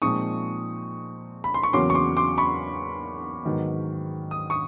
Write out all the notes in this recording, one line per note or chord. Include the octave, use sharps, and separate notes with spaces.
A#2 F3 G#3 C4 D#4 C#6 D#6
B5
C6
C#6
E2 C#3 F#3 A#3 C#4 C6 D6
C#6
C6 D6
C6 D6
B5 C#6
G#2 D#3 F#3 B3
D#6
C#6 D#6